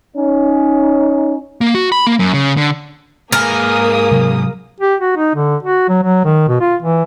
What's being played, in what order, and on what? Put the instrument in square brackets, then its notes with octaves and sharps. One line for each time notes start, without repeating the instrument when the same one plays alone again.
[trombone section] C#4 D#4
[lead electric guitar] A#3
F#4
B5
A#3
F#2
C#3
D3
[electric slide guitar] G#2 B4 G#5 [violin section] A#3 G#4 D#6 [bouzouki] A#4
[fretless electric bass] C3 F#3
[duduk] G4
F#4
D#4
D3
F#4
F#3
F#3
D#3
B2
F4
E3